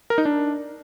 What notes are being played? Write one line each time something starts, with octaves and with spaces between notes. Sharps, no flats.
A#4
D#4
D4